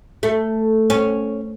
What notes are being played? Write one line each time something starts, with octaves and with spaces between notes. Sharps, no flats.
A3
C#4